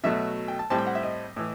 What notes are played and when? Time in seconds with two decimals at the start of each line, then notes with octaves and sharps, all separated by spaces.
0.04 B2 F#3 A3 E5
0.48 G5
0.59 A5
0.70 A2 G3 C4 A5
0.78 G5
0.87 F#5
0.95 E5
1.03 D#5
1.36 A2 E3